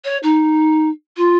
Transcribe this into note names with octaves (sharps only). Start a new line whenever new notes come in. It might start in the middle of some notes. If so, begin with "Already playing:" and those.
C#5
D#4
F4